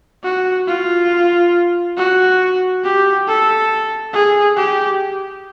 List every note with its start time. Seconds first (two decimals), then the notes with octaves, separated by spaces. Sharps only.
0.23 F#4
0.67 F4
1.97 F#4
2.83 G4
3.27 A4
4.13 G#4
4.57 G4